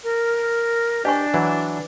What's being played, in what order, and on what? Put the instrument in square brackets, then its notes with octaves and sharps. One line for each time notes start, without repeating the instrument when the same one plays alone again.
[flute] A#4
[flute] D4 [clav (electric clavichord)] G4 [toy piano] D#5 G#5 C#6
[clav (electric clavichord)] E3 F#3